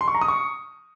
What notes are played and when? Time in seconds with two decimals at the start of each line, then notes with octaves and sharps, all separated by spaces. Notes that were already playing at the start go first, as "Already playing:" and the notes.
0.01 C6
0.08 C#6
0.15 A#5
0.21 D#6
0.28 C#6